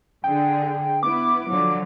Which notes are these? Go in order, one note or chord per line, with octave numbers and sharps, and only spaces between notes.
D3 G#4 G5
B3 E4 D6
D3 F3 F#3